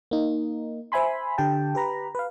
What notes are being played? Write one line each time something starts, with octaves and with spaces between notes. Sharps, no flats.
A#3 D#4
C5 E5 G#5 B5 C6
D3 G4 G5 A5
G4 B4 A#5 B5
B4 F5